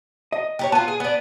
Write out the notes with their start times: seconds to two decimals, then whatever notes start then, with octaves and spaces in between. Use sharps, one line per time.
0.32 D#5
0.59 G4 A#4 C#5
0.72 B3 F4 A5
0.88 G#4
1.00 B3 D4